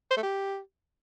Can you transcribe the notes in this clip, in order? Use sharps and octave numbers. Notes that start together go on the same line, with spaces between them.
C5
A3
G4